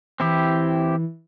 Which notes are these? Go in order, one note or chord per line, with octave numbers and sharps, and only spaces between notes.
E3 C4 E4 G4